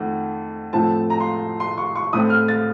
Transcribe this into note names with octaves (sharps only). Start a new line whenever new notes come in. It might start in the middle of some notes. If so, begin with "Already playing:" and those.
Already playing: F2 D#3 A3 F#5
A2 F3 A3 C4 A5
A#5
C6
C6
C#6
C#6
A2 A3 C4 D#6
F6
A6